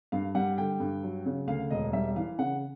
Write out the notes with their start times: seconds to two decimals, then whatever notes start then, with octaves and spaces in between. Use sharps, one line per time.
0.12 G2 F5
0.35 G3 F#5
0.58 D3 G5
0.80 G2
1.03 F#3
1.26 C#3
1.47 D2 F5
1.71 E1 D#5
1.93 G3 E5
2.16 E3 F5
2.38 C#3 F#5